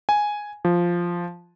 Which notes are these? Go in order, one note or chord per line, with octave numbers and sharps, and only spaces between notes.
G#5
F3